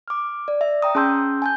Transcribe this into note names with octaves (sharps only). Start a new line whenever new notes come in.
D6 F6
D5
E5
G5 A#5 D#6
C#4 G#4 A5 C6 E6 G6
G#5 A5 G6